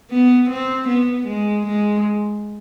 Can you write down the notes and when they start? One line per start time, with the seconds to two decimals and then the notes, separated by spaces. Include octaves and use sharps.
0.11 B3
0.50 C4
0.89 B3
1.27 G#3
1.66 G#3